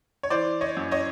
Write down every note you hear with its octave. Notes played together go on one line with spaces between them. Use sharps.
C#5
E3 C5 D5
C#5 D#5
F#2
C#5 D#5